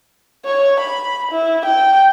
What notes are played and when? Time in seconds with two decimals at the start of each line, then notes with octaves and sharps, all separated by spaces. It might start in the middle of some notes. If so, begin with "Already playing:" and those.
0.46 C#5
0.80 B5
1.32 E4
1.66 G5